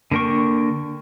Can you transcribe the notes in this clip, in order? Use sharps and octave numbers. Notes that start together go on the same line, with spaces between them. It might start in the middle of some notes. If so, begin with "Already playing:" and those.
D3 A#3 A#4 G5 C#6